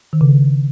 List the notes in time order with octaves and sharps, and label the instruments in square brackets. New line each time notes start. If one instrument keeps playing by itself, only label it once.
[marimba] D#3
C#3